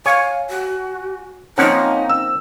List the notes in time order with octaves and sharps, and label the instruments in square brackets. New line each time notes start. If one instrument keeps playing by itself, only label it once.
[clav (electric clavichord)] C#5 [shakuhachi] F5 [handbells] G#5
[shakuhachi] F#4
[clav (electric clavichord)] F3 A#3 F#5 [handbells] C4 [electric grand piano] C#4 [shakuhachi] D#4
[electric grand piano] E6